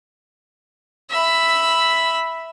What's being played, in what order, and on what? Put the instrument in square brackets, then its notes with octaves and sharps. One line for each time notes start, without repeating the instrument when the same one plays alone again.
[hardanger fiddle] E5 B5